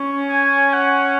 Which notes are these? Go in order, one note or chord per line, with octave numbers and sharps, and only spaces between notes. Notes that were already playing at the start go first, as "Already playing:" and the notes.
Already playing: C#4
G#5
F#5